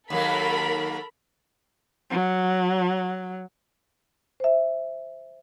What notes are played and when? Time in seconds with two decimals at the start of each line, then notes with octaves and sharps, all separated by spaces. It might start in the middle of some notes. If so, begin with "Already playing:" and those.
0.10 D#2 F#3 A#3 A4 A#4 B5
2.11 F#3
4.40 C5 E5